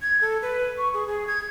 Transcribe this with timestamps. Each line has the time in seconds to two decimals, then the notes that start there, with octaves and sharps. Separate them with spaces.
0.02 G#6
0.21 A4
0.42 B4
0.78 C#6
0.94 G#4
1.07 G#4
1.27 G#6